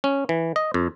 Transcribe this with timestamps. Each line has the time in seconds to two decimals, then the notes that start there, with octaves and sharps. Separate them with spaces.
0.04 C#4
0.29 E3
0.56 D#5
0.74 F2